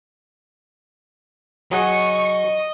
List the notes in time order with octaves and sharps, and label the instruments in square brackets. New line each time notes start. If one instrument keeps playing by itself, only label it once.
[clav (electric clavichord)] F#3 G#4 F#5 [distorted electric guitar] D#5 [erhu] C#6